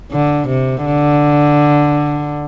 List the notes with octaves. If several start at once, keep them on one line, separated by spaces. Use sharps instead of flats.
D3
C3
D3